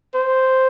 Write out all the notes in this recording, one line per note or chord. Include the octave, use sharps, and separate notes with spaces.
C5